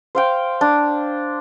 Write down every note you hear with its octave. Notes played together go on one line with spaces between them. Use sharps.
C5 F5 G5
D4